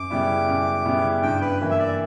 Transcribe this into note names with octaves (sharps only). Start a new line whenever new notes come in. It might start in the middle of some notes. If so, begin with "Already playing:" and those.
Already playing: F#2 D6
C#3 G3 B3 E4
F#2
C#3 G3 B3 E4
G2 G5
B4
E3 A#3
E5
D5